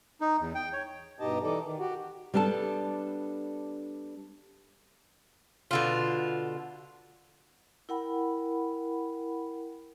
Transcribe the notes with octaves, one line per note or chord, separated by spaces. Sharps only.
D#4
E2
G5
C#5
G2 B2 D#4 G4 D#5 A5
E3 D#4 A4 D5
D#3
F#4 G4
G3 B3 D4 A4 A5
B2 D3 F4
E4 A#4 F#5 G5 B5